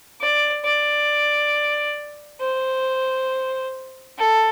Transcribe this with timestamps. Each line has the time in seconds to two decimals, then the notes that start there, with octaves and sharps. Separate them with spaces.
0.20 D5
0.64 D5
2.40 C5
4.18 A4